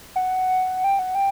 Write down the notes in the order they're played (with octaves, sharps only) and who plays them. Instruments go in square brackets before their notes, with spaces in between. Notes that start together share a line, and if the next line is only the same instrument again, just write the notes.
[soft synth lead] F#5
G5
F#5
G5